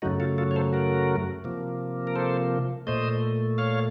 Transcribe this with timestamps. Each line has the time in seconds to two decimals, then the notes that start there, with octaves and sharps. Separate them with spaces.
0.02 F#2 C#3 F#3 A3 D#4 F#4
0.20 F4 A4
0.38 F4 A4
0.51 C#5
0.56 A4 C5
0.73 F#4 A#4
1.44 C3 F3 A#3
2.07 A#4
2.16 A4 C5
2.87 A#2 A3 C5 D#5
3.58 C#5 F5